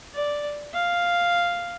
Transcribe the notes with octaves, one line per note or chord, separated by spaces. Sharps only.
D5
F5